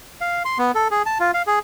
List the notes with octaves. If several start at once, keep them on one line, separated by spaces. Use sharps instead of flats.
F5
C6
B3
A4
G#4
A5
F4
F5
G#4